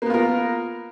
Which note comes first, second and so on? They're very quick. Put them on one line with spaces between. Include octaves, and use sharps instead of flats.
A#3 B3 F4 A#4